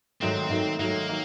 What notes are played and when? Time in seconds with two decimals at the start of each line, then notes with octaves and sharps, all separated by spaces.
0.21 G#2 D#3 F#3 A3 C4
0.50 G#2 D#3 F#3 A3
0.79 G#2 D#3 F#3 A3 A#3
1.09 D#3 F#3